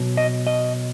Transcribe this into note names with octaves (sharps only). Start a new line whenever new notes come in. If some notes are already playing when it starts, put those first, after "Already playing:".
Already playing: B2 F#3
D#5
D#5